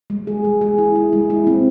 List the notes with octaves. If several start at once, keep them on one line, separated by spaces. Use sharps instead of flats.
G#3
G#4
G#3
G#4
E4
E4
G#3
E4
C4